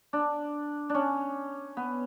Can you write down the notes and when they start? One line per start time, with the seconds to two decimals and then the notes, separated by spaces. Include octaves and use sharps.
0.13 D4
0.90 C#4 D4
1.77 B3